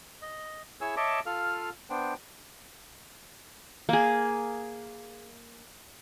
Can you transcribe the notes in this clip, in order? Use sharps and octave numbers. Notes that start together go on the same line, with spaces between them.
D#5
E4 G#4 C#5 G#5 E6
C#5 D#5 E5 A5 D6
F4 A4 F5 F6
B3 D4 C5 G5
A#3 G#4